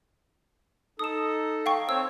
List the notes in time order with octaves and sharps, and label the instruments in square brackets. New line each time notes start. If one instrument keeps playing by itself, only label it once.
[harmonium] D#4 A4 [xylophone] D#6 E7
[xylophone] F5 G5 C#6
[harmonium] C4 C5 C#5 [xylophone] E6